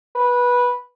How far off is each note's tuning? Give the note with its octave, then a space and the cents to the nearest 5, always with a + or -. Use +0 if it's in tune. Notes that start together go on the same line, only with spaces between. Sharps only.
B4 -15